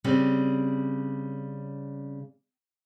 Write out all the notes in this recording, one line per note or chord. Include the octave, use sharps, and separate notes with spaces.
C#3 G3 C4 C#4